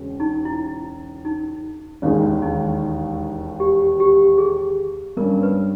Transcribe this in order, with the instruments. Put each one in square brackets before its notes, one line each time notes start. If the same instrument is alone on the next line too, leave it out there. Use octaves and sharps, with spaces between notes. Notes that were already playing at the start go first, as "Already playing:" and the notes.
Already playing: [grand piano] E1 C#3
[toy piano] D#4
E4
D#4
[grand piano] E1 D#2 D#3 G#3 [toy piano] C#4
[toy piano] D#4
G4
G4
G#4
[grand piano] G2 G3 C#4 [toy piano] A#4
[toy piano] B4